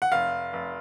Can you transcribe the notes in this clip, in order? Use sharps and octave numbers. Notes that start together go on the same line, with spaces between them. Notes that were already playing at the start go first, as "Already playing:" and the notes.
F#5
F1 F5
F1